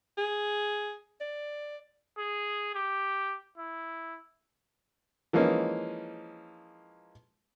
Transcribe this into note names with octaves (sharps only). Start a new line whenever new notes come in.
G#4
D5
G#4
G4
E4
E3 F3 G#3 A#3 C#4 D#4